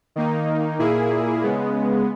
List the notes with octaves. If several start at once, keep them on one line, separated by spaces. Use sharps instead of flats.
D#3 A#3 D#4
A#2 A#3 E4 G#4
C#3 G#3 B3